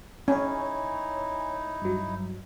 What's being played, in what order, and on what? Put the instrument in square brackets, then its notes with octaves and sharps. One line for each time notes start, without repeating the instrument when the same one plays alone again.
[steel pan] C#4 [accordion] D#4 E4 [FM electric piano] C#5 G#5
[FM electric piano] G2 F#3